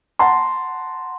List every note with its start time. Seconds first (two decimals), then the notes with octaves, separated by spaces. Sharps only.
0.19 F#5 A5 A#5 C6